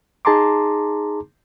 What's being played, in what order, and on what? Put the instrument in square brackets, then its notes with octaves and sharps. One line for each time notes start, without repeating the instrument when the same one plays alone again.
[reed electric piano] D#4 G#4 A5 A#5 C6 D6